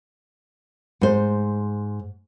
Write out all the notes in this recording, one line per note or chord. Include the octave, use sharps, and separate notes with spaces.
G#2 C5